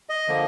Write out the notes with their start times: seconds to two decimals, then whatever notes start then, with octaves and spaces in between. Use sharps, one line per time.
0.09 D#5
0.28 D3 F3 A#3